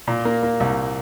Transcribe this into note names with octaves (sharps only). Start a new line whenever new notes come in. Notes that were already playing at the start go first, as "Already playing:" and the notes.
A#2
A#3
A#3
C2